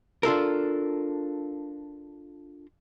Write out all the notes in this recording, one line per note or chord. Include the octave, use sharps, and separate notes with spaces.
D4 F4 A4 A#4